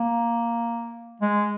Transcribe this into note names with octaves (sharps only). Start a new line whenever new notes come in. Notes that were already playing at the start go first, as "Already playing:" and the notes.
Already playing: A#3
G#3